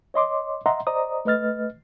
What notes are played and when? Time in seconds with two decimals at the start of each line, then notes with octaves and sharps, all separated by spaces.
0.14 C#5 D#5 C6 D6
0.66 D#5 E5 F#5 A#5 C6
0.87 C5 D5 D#5 A#5 D#6
1.25 A3 B4 D#5 F6 A6